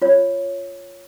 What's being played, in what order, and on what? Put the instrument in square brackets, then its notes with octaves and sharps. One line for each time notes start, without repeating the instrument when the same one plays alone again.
[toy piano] F4 C#5